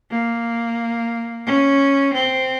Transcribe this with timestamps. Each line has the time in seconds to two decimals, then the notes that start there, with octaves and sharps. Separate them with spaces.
0.11 A#3
1.46 C#4
2.14 C4